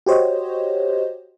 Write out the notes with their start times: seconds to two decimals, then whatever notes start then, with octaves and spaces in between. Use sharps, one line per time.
0.06 F#4 G4 C5 C#5 D#5